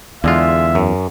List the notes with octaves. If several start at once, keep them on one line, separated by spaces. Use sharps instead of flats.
E2 D3 G#3 F4 E5
F#2